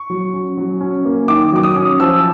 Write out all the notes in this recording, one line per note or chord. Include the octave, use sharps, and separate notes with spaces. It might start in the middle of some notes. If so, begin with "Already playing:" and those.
Already playing: C#6
F#3
C#4
F#3
C#4
A#3
D#3 D6
F#3 D6
D#6
C#4
F3 E6